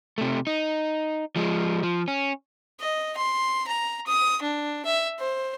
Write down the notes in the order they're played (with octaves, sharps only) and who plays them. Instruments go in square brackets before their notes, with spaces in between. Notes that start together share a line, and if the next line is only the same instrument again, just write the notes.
[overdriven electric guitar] C3 A3
D#4
F3 G#3
F3
C#4
[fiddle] D#5
C6
A#5
D#6
D4
E5
C5